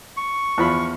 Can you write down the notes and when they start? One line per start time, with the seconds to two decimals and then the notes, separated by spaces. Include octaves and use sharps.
0.17 C#6
0.58 E2 F3 B5